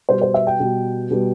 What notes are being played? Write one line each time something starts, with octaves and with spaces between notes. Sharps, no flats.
B2 G3 B3 C5
C5
E5
G5
B2 G3 B3
B2 G3 B3